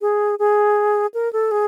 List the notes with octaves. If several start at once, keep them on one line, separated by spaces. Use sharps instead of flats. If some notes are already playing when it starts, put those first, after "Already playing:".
G#4
G#4
A#4
A4
G#4